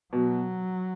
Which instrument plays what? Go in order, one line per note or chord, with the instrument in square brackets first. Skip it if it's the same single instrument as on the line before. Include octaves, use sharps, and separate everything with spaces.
[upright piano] B2 [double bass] F#3